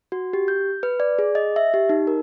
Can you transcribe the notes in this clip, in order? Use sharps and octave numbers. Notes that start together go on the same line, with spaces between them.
F#4
G4
G6
B4
D5
G#4
D#5
E5
G4
D#4
A#4